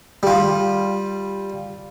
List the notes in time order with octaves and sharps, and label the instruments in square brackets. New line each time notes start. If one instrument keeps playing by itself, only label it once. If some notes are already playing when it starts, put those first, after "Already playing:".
[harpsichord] G3 F4